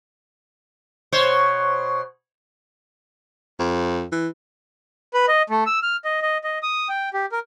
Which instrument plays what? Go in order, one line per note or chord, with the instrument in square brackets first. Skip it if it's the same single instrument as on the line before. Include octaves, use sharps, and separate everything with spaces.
[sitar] B2 C5 C#5
[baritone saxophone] F2
E3
[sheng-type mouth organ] B4
D#5
A3
E6
F6
D#5
D#5
D#5
D#6
G5
G4
A#4